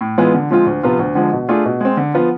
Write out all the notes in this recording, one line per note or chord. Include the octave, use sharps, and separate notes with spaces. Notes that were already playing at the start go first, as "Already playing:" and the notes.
A2
E3 G#3 B3 F4
D3
F3 G#3 C4 F4
D2
C3 F3 B3 F4
D2
D3 F3 G#3
B2
A3 D4 F4 G#4
B2
G#3 C4
D3
F3 B3 F4